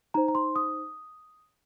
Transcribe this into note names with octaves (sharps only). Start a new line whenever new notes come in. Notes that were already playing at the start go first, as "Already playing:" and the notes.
D#4 C5 A#5
A#5
C6
D#6